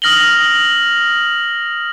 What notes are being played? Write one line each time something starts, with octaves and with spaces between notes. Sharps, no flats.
D#6 F6 A#6 F#7 G7